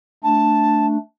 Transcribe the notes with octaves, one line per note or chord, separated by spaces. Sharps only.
A3 D4 A5